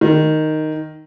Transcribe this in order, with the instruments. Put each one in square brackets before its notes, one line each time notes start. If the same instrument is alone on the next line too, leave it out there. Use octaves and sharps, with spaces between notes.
[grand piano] D#3